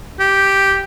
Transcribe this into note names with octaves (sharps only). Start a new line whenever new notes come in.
G4